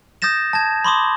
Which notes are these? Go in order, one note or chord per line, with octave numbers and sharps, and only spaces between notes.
D#6 G6 A6 A#6 E7
A5 G#6
B5 C6 D6 D#6